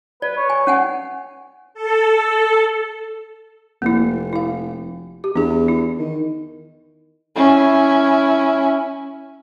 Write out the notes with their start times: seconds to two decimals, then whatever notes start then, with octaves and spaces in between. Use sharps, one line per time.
0.22 B4 D5
0.37 C#5
0.50 G#5
0.67 C#4 F#5 G#5
1.74 A4
3.82 F1 A#3 E4
4.33 E4 F5
5.24 G4
5.36 E2 D4 G#4
5.68 E4
5.99 D#3
7.36 C#4 E4